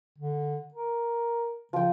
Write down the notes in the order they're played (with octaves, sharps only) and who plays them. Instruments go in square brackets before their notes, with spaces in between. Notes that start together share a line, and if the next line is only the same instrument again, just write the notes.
[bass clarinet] D3
A#4
[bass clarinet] C#3 [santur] F3 G5